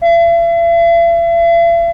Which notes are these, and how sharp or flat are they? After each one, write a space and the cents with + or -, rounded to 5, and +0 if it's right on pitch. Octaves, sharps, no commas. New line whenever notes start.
E5 +45